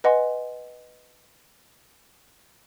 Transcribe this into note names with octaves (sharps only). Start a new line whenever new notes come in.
B4 D#5 F#5 G#5 C6